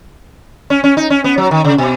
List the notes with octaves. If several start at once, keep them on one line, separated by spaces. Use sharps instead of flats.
C#4
C#4
D#4
C#4
B3
F#3
D#3
C#3
B2